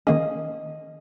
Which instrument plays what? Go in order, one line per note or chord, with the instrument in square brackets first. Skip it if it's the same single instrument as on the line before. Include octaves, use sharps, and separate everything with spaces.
[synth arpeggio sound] D#3 A#3 C#4 G#4 [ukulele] D#5